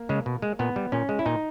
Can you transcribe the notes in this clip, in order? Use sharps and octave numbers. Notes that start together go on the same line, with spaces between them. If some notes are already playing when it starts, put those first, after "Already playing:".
Already playing: A#3
C#3 G#3
B2
G#3
A#2 B3
G3
A#2 C#4
G#3
E4
A#2 D#4